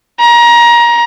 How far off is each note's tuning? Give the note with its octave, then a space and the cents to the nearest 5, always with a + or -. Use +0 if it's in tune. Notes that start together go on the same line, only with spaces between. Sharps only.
A#5 +25